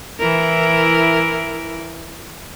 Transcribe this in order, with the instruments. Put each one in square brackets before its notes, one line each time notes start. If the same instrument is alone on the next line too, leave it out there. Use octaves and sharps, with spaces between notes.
[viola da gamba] E3 E4 A#4